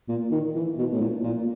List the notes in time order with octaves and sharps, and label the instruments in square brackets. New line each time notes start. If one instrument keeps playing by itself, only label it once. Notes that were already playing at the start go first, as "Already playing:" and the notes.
[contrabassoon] A#2
D#3
E3
B2
A2
A#2
A#2